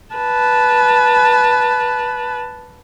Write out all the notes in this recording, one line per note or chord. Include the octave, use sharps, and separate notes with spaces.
B4 A5